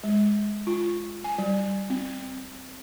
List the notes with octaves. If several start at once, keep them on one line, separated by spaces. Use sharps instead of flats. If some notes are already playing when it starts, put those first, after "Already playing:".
G#3
F4
G#5
G3
C4